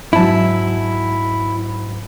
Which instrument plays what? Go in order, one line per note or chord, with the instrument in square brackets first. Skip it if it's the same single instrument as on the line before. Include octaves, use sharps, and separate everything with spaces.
[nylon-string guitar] G#2 F#3 [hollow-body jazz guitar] E4 A5